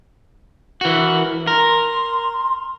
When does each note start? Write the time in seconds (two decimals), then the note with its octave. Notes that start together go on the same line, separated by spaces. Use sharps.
0.81 E3 F#4 A#4
1.47 A#4 C6